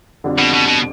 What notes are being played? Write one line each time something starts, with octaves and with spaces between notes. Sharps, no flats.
F2 D3 G3 D4 F4
B2
B2
B2